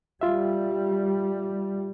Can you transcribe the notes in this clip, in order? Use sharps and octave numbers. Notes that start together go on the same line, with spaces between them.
G3 F4 E5